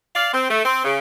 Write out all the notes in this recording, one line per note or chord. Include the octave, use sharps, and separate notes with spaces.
D5 F5
C4
A3
C4
C#3